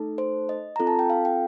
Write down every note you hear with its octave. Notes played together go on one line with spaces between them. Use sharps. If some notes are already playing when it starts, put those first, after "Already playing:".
Already playing: A3 D#4 A4
C5
D#5
C4 F4 A4 A#5
A5
G5
F5
G5